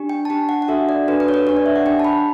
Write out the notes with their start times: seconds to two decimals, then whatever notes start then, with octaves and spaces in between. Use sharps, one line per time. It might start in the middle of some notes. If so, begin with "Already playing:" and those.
Already playing: D4 G4
0.09 G5
0.25 A5
0.30 D4 G4 G5
0.49 F#5
0.62 F#5
0.68 D4 F#4 A4 E5
0.89 D5
1.08 D4 F#4 A4 B4
1.20 B4
1.28 C#5
1.34 B4
1.47 D4 G4 C#5
1.57 D5
1.66 E5
1.76 F#5
1.86 D4 G4 G5
2.00 A5
2.05 B5